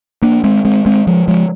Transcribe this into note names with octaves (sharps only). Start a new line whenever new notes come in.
A#3 D4
G#3 C4
G#3 C4
G#3 C4
F3 G#3
F3 G#3